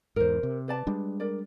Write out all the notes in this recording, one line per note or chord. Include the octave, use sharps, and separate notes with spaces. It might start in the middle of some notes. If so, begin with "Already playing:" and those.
E2 G#2 A#4 C5
C3
B4 D5 A5
G3 G#3 D4
A#4 D5